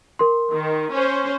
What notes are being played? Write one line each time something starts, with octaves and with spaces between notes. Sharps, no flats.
A#4 C6
D#3
C#4 C5